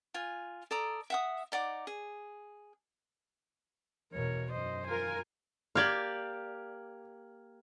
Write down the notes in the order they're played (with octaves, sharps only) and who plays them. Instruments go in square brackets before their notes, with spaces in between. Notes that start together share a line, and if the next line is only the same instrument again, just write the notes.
[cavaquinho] F4 G#5
A4 D5 A#5 D#6
E5 F#5 D#6
D#4 D5 F#5 D6
G#4
[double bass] E2 B2 [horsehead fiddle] A#4 C#5
[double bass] F#2 [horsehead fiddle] C5 D#5
[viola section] F4 A#4 [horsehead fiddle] G#5
[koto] A#3 G4 D5 [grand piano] F6 G#6 F#7